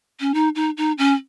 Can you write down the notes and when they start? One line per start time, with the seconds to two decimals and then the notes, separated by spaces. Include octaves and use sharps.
0.20 C#4
0.34 D#4
0.55 D#4
0.77 D#4
0.98 C#4